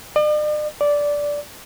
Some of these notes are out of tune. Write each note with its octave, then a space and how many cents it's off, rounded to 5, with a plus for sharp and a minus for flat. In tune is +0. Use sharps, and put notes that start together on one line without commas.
D5 +45
D5 -10